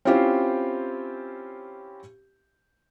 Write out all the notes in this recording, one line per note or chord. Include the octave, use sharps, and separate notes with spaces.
C4 C#4 E4 F4 G4 C5